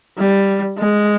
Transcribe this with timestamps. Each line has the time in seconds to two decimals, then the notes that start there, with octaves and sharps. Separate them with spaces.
0.18 G3
0.79 G#3